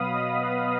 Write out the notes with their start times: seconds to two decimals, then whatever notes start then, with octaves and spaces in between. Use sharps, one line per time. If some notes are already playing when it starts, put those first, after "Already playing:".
Already playing: B2 F#3 B3 F5 B5 D#6
0.13 D#5
0.41 B4